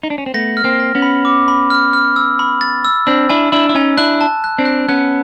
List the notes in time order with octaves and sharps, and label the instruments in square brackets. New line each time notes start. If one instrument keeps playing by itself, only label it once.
[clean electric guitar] D#4
D4
C#4
C4
[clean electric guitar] A3 B3 [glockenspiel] A#6
[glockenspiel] F6
[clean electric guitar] A#3 C4
[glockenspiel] A#6
[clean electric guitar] B3 C#4
[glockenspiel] B5
D6
B5
F6
F6
E6
B5
A6
E6
[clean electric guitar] C4 D4 [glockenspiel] E6
[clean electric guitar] D4 E4 [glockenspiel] G#5
[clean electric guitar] D4 E4 [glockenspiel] E6
[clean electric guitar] E4
[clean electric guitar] C#4 D#4 [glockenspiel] G#5
[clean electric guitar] D4 E4 [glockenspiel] F#6
[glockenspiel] A5
F#6
[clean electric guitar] C4 D4
[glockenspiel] F#6
[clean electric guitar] B3 C#4 [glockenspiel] F#6